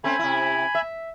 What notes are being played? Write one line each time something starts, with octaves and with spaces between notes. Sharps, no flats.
A3 C4 C#4 G#5 B5
C3 E4
E5